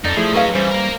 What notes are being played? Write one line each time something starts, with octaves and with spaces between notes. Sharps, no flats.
F2 D#4 A4 D5
F3 A3 E4 G#4
F#3 C#4 B4 D#5 F5
C#3 E3 G3 C5
A#3 A#4